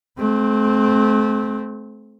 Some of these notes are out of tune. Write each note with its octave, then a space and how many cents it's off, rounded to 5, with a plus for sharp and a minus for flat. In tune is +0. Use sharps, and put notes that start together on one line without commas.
A3 -35 C4 +0